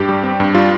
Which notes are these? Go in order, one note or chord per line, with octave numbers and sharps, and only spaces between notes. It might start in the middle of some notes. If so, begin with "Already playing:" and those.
Already playing: G2 G4
G3
C4
G2
G3 F4